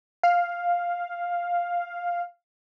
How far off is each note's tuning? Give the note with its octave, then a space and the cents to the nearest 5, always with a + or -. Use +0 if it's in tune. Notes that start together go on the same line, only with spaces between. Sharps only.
F5 +5